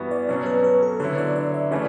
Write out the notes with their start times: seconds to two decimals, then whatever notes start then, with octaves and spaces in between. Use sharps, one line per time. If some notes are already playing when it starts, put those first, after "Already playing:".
Already playing: G2 E3 B3 F#4
0.11 D5
0.29 B2 F#3 C#4 C#5
0.46 B4
0.64 B4
0.83 A4
1.00 D3 F#3 B3 E4 C#5
1.18 D5
1.36 D5
1.54 E5
1.71 C#3 E3 A3 D5